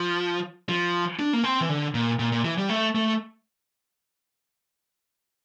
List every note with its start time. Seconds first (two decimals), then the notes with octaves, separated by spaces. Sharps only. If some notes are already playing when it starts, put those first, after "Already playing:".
Already playing: F3
0.69 F3
1.19 D4
1.33 A#3
1.44 C4
1.61 E3
1.69 D3
1.94 A#2
2.19 A#2
2.32 A#2
2.45 E3
2.58 G3
2.70 A3
2.95 A3